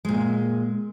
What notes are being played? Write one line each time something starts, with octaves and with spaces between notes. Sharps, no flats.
A#2 G#3